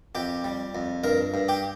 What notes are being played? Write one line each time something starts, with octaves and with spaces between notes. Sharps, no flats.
F2 G4 G5
G3
F2
G2 A#4 A#5
G2
G4 G5